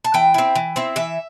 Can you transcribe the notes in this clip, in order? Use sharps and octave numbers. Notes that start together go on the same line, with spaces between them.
A5
E3 G5
C4 E4
E3
C4 E4
E3 E5